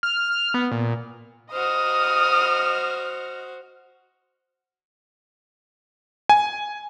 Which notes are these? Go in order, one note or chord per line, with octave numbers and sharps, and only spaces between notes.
F6
B3
A#2
F#4 C5 D#5 D#6 F6
G#5